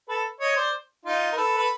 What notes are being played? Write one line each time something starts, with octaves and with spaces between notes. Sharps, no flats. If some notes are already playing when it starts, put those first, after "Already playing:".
A4 B4
C#5 D#5
C5 D5
D#4 F4
A#4
A4 B4
B4